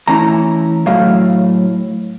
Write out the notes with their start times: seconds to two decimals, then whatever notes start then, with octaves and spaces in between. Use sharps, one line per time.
0.08 E3 A3 C#4 E4 A#5
0.86 A2 F#3 A3 F5